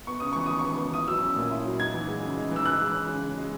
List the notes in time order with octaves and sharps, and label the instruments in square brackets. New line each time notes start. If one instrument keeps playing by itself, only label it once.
[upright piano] B3 C#6
C#3 D#6
E3 C#6
D#2 D#6
C#6
B3
C#3
E4 D#6
F#3 E6
C#4
A#2
E4
F#3
D#4 G#6
E3
G#3
C#3
D#4
E3 E6
C#3 F#6
G#3
C#4
C#3
C#3
G#3